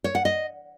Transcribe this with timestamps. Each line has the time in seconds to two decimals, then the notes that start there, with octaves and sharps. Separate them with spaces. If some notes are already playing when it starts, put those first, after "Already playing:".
0.04 C#5
0.15 F#5
0.25 D#5